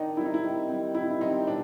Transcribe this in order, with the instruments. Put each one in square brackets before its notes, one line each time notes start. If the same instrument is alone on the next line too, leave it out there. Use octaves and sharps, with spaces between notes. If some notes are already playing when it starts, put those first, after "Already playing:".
Already playing: [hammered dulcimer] D#3 [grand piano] D4 D#4
[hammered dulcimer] G3 [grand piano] E4
[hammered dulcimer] C4 [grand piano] D#4
[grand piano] E4
[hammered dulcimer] D#3
G3 C4
[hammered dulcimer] D#3 [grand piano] E4
[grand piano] E4
[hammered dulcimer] G3 C4 [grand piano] D#4
[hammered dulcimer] B2 [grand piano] D4